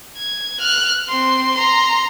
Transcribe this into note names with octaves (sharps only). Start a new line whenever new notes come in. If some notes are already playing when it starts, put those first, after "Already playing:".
G#6
F6 F#6
C4 C6
A#5 C6